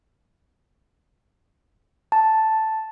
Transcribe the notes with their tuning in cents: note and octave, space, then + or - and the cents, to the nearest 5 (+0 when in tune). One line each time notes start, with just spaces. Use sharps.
A5 +0